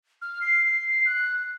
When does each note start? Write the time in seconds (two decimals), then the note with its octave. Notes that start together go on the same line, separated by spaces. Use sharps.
0.22 F6
0.41 C7
1.06 F#6